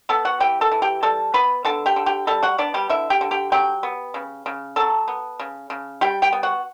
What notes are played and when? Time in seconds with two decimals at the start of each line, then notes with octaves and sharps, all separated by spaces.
0.09 B3 A4 A5
0.25 F#4 F#5
0.40 E3 G4 G5
0.61 A4 A5
0.72 E3
0.82 G4 G5
1.03 G3 A4 A5
1.34 B3 B4 B5
1.65 D3 A4 A5
1.86 G4 G5
1.96 D3
2.06 G4 G5
2.27 G3 A4 A5
2.43 F#4 F#5
2.58 B3 D4 D5
2.74 G3 G4
2.89 D3 E4 E5
3.10 G4 G5
3.21 D3
3.31 G4 G5
3.52 F#3 G4 G5
3.83 B3
4.14 C#3
4.46 C#3
4.76 F#3 A4 A5
5.08 B3
5.39 C#3
5.70 C#3
6.01 G3 G4 G5
6.22 G4 G5
6.32 B3
6.43 F#4 F#5